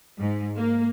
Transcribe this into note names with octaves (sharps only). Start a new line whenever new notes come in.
G#2
A#3